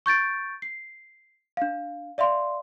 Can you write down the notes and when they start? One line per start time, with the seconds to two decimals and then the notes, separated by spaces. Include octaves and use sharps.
0.06 C#6 G6 A6 D7
0.62 C7
1.57 D4 F5
2.18 D5 E5 F5 C6